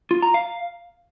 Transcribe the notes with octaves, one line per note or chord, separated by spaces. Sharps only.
F4
A#5
F5